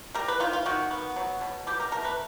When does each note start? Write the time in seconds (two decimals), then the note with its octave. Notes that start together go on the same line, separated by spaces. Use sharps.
0.15 G3 A#4
0.28 B4
0.40 D#3 F4
0.53 F4
0.66 D#3 F#4
0.91 B3
1.16 F#3
1.41 B2
1.67 B2 G4
1.80 A#4
1.91 A3 A#4
2.05 B4